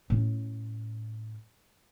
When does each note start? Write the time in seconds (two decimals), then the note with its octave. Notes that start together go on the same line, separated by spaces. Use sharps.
0.10 A2 C#4